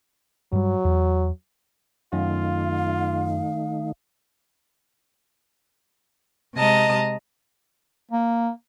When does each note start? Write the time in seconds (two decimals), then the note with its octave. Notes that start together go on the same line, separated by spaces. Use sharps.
0.53 G2 F#3 G3
0.85 E2
2.13 F#2 D#3 A3 D#4 F4 F5
6.55 C3 G#3 D#5 A5 A#5 D#6
8.11 A#3